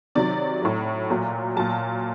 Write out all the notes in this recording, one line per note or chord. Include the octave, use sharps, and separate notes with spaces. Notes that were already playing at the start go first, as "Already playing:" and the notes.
C3 D#3 F#3 D5
A2 F#3
A#2 F#3
A#2 F#3 A5